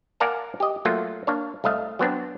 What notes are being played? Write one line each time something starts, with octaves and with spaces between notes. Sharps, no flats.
A#4 D5 F5 F#5 G#5 A5
G4 D#5
F#3 A3 A#3 F4
A#3 D4 C#5
C2 A3 D#5 F5
F#3 B3 C4 D4